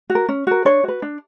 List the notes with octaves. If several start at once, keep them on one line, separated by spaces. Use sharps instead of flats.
F#4
A#4
C#4
F#4 A#4
D4 C#5
F#4 B4
D4